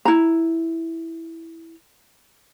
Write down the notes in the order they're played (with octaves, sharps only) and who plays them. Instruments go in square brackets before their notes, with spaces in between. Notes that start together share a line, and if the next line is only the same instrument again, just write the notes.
[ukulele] E4 A#5